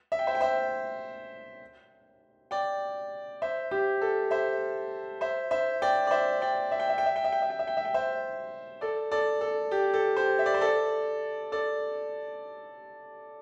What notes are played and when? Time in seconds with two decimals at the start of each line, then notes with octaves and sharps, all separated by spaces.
0.12 E5
0.19 G5
0.27 C5 E5
0.35 G5
0.41 C5 E5
2.51 D5 G5
3.42 C5 E5
3.71 G4 C5
4.02 A4
4.31 C5 E5
5.21 C5 E5
5.51 C5 E5
5.82 D5 G5
6.07 D5
6.11 C5 E5
6.42 D5 G5
6.71 E5
6.80 G5
6.89 E5
6.98 G5
7.06 E5
7.16 G5
7.25 E5
7.32 G5
7.42 E5
7.50 G5
7.59 E5
7.67 G5
7.77 E5
7.85 G5
7.94 C5 E5
8.81 A4 D5
9.12 A4 D5
9.41 A4
9.71 G4
9.94 A4
10.17 G4 C5
10.39 E5
10.46 D5
10.54 C5
10.61 A4 D5
11.52 A4 D5